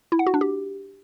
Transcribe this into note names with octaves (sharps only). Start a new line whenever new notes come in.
E4
F#5
F#4
D4
G4